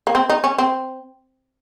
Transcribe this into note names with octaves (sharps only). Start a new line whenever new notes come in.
A#3
C4
D#4
C#4
C4